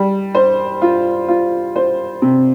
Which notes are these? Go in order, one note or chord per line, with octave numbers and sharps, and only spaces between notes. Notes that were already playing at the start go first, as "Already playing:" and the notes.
Already playing: G3
C5
F4
F4
C5
C3